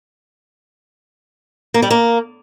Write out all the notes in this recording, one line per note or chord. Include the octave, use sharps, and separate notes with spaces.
A#3
G3
A#3